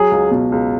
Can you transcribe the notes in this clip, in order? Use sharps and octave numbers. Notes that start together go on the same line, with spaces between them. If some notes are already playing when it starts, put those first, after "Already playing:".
Already playing: F#3 G#4
C#2
B2
C#2